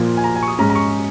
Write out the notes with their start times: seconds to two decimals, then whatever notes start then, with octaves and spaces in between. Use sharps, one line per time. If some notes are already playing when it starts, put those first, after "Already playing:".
Already playing: A#2 F3 A#3
0.17 G#5
0.24 A#5
0.36 G#5
0.43 C#6
0.48 D#6
0.59 G#2 G#3 C#4 A#5
0.70 A#5
0.76 C#6